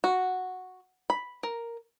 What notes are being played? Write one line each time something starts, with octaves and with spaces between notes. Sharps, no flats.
F#4
B5
A#4